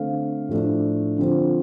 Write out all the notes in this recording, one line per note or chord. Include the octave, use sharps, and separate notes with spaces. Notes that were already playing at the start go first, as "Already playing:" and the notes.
Already playing: D3 A3 C4 F5
A2 F3 A3 D4
D3 F3 C4 F4